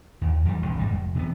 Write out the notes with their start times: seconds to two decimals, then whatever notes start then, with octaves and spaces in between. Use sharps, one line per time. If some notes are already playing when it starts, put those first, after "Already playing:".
0.21 D#2
0.45 F2 E3 F#3 G3
0.62 D#1 C2 G2
0.77 G#1 G3 G#3
0.92 F1
1.15 C3 E3 G#3 B3